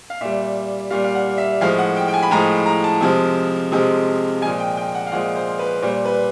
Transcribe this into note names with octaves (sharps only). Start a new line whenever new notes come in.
F5
A#2 G3 E5
A#2 G3 F5
F5
F#5
E5
A2 F3 G#3 F5
F#5
G5
G5
G#5
B5
A2 F3 G#3 A#5
A#5
A5
C3 F3 G#3
C3 F3 G#3
A#2 F3 G#3 G#5
G5
G5
F#5
F5
A#2 F3 G#3 F#5
C5
B4
A#2 G3 C5
B4